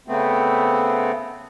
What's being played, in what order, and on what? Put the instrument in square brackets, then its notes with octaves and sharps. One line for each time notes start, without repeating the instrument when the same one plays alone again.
[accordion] C#3 A3 B3 C4